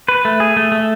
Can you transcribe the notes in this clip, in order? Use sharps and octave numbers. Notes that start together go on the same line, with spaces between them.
B4
A3
G#4
A3
A3